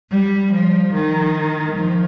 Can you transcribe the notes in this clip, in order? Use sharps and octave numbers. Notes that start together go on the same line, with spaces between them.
G3
F3
D#3
F3